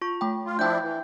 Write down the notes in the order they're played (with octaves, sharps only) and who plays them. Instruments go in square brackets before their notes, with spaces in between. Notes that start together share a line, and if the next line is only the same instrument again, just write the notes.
[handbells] F4 C#6
A3 G5
[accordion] F4
[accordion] F3 D4 E4 [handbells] G5 G6
[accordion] E3